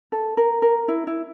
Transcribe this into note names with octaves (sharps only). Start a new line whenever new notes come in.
A4
A#4
A#4
E4
E4